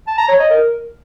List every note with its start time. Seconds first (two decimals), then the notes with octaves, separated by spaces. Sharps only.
0.07 A5
0.18 A#5
0.29 C#5
0.39 D#5
0.50 A#4